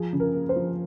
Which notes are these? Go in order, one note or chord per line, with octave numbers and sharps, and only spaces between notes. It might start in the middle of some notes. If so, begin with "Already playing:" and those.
Already playing: F3 G#4
C#3
A#4
A#3
C5
F3